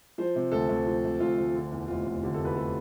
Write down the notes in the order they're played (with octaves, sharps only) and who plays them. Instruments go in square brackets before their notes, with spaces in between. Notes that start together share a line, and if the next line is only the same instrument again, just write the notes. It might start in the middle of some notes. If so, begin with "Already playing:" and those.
[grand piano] F3 C5
C3
D2 A4
D2
F3
C3
D2 F4
D2
D3
E2
F1 F4
F1
D3 G4
A4
E2 B4
A4